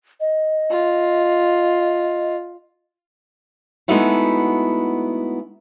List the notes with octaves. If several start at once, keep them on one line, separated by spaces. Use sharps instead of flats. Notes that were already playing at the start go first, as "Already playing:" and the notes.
D#5
F4
G#3 A3 B3 D#4 E4 F#4